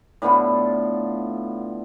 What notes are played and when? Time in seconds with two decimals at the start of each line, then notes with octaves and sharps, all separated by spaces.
0.22 A2 D3 B3 F4